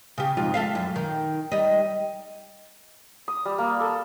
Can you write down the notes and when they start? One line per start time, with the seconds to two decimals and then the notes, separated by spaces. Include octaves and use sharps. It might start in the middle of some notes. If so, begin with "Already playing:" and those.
0.18 C#3 G4
0.37 F2 G#2 F4
0.54 A4 E5 F5
0.75 F#2
0.96 D#3
1.52 G3 D#4
3.28 D#6
3.45 G3
3.58 A#3
3.80 A4